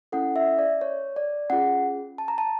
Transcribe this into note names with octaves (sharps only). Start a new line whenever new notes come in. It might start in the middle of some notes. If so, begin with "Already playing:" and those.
C#4 E4 A4 F#5
E5
D5
C#5
D5
C#4 F4 G#4 F#5
A5
A#5
A5